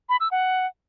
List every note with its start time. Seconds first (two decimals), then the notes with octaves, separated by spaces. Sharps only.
0.09 B5
0.20 E6
0.31 F#5